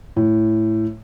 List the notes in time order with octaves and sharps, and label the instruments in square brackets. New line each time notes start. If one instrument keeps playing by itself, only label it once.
[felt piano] A2